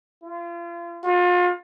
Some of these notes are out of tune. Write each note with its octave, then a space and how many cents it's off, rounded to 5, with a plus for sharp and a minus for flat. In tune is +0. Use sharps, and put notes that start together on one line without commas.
F4 -35
F4 +35